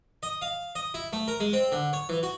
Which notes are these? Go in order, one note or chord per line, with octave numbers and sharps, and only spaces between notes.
D#5
F5
D#5
E4
A3
A#4
G#3
C4
D3
C#5
E3
F#4